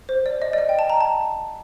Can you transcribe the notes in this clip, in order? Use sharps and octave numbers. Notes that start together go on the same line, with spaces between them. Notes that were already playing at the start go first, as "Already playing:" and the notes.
C5
D5
D#5
D5
D#5
G5
A5
A#5
A5